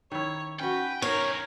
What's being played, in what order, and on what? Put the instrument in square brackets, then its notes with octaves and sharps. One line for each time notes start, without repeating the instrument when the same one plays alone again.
[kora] D#3 E4 [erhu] C#5
[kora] C#4 F#4 [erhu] B4 [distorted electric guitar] G5
[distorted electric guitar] A#3 C#4 [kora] D#4 [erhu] A#4 [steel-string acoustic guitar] C#5